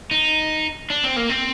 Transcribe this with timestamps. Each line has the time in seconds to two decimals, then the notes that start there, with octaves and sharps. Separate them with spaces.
0.11 D#4
0.90 D4
1.04 C4
1.16 A#3
1.29 C4